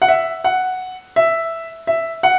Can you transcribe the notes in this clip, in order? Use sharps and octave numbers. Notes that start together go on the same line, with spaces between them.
F#5
E5
F#5
E5
E5
F#5